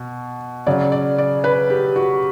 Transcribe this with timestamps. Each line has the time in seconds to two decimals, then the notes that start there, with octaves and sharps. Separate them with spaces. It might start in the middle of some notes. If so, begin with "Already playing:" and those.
Already playing: B2
0.67 C#3 F#3 D5
0.92 D5
1.18 D5
1.44 B4
1.70 G4
1.96 F#4